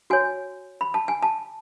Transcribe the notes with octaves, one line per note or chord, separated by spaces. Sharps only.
F#4 C#5 G#5
B5
A5
G#5
A5